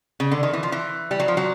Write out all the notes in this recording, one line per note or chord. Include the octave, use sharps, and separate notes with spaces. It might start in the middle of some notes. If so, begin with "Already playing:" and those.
C#3
D3
D#3
E3
F3
E3
G3
F#3
F3
F#3